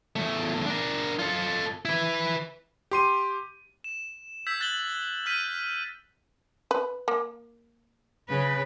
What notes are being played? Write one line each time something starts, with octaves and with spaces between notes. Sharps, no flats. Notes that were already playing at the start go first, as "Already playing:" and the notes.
E2 A3
D4 A#4
F4 A4
E4 B4
G4 C6 D#7
E7
E6 G6 G#6 B6
F#6 A6 B6 F#7 G7
F6 G6 B6 D#7
B4
A#3
C#3 B4